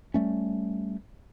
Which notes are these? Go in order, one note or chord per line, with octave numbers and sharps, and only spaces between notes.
G3 A3 C#4